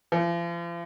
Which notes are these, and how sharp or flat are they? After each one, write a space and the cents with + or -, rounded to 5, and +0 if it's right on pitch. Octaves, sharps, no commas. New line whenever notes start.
F3 -40